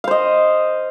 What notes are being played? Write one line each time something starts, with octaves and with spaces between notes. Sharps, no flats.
C5 D#5 F5